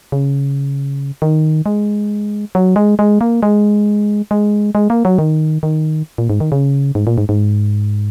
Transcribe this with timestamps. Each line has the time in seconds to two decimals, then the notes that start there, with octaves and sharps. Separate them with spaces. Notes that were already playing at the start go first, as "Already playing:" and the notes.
0.12 C#3
1.22 D#3
1.66 G#3
2.55 F#3
2.76 G#3
2.99 G#3
3.21 A#3
3.43 G#3
4.31 G#3
4.75 G#3
4.90 A#3
5.05 F#3
5.19 D#3
5.63 D#3
6.18 A#2
6.30 G#2
6.40 D#3
6.52 C#3
6.95 G#2
7.07 A#2
7.18 G#2
7.29 G#2